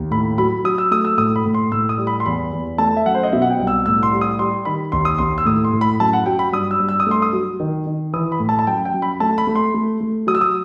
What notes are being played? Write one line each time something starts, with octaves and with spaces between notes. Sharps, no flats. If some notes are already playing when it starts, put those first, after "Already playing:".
Already playing: D#2
A2 B5
F#3 B5
F#3 D#6
E6
A3 D#6
E6
A2 D#6
B5
A2
C6
A2 E6
D#6
G3
B5
C6
E2 B5
E2
A3 A5
E5
F#2 F#5
C5
D#5
B2 E5
F#5
G5
C2
E6
A2 E6
C6
G3
D#6
G3 C6
D#3 B5
D#2 C6
D#6
D#2 C6
E6
A2 D#6
C6
A2
B5
F#2 A5
F#5
F#3 G5
B5
G2 D#6
E6
G2
E6
D#6
A3 C6
D#6
F#3
D#3
D#3
E3 D#6
B5
A2
A5
A5
F#2 G5
G5
F#2
B5
A3 A5
B5
A3
C6
A3
A3
F#3 D#6
E6
D#6